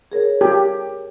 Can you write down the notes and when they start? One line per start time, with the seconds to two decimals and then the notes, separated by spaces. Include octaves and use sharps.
0.12 G#4 A#4 C#5
0.41 G4